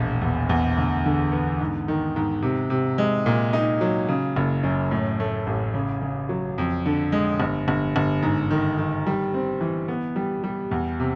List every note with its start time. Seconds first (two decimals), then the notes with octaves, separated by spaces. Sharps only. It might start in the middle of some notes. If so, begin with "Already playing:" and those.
Already playing: E1 A#1
0.21 E2
0.49 E2
0.77 D2
1.06 D3
1.32 B3
1.60 G#2
1.88 D#3
2.16 G#2
2.42 C3
2.70 C3
2.98 G#3
3.26 A#2
3.53 D#4
3.81 F#3
4.09 C#3
4.36 F#1
4.63 F#2
4.91 A2
5.20 A3
5.47 A1
5.74 C#3
6.01 C#3
6.29 F#3
6.58 F2
6.86 D3
7.12 G#3
7.40 G1
7.68 G1
7.96 G1
8.23 G#2
8.51 D#3
8.78 D#3
9.07 G3
9.34 C4
9.61 E3
9.88 B3
10.16 G3
10.44 G3
10.71 E2
11.00 C3